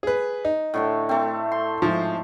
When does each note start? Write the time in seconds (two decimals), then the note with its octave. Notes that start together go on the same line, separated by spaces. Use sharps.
0.03 G#4 B4
0.45 D#4
0.74 A2 D3 A3
1.09 A3 C4
1.52 C6
1.82 G#2 F3